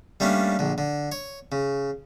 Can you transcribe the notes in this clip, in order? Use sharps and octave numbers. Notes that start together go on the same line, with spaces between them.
G3 A3 A#3 C#4 D4
A#1 D3
D3
C#5
C#3